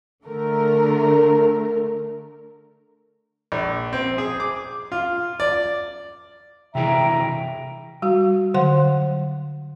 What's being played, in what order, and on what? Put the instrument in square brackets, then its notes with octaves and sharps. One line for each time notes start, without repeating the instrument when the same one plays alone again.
[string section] D3 A3 A#4
[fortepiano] A#1
C4
G#4
D6
F4
D5
[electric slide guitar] C3 E3 G#4 [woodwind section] E5 A#5 [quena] G5
[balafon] G3 F#4
D3 F#3 F#5 C6